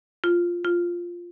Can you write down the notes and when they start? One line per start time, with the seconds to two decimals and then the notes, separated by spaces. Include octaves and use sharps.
0.24 F4
0.64 F4